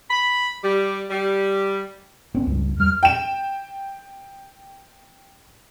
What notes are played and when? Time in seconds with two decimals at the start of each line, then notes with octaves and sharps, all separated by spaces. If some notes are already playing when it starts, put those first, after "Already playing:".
0.10 B5
0.63 G3
1.10 G3
2.34 G1 B3 C#4
2.47 C#2 G2
2.78 E2 G3 F6
3.03 G5 E7